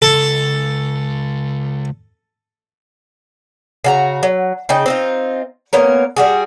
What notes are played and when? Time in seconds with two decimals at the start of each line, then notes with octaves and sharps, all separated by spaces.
0.02 C#2 A4
3.84 C#3 F#4 A#5
4.23 F#3
4.69 C#3 D#4 G5
4.86 C4 D#4 F4
5.73 A#3 B3 C#4 A#4
6.16 G3 F#4 G#4